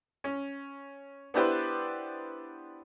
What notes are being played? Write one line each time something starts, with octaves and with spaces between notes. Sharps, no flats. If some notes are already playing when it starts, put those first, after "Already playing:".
C#4
B3 D4 E4 G4 B4 C5